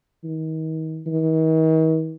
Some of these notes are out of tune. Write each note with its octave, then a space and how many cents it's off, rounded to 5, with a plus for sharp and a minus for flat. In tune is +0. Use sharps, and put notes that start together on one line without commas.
D#3 +35
D#3 +45